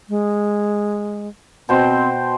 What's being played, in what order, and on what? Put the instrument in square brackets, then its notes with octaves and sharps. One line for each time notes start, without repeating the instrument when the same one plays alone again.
[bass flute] G#3
[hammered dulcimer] B2 C5 G5 [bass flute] C4